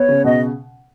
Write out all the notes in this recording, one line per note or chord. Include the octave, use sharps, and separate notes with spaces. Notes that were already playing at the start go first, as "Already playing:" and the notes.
Already playing: B3 C#5
C#3
B2 D#5